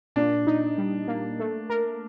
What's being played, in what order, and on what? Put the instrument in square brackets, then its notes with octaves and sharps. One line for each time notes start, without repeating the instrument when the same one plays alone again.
[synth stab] A#2 [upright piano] D4
[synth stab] D#4
G3
A#3
A3
A#4